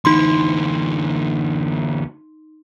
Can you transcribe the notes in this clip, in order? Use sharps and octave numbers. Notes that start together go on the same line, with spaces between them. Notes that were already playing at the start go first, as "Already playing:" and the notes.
D2 E3 D#4 C6